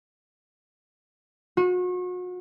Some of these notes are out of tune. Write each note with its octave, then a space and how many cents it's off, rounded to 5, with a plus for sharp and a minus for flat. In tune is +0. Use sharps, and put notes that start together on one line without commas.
F#4 -40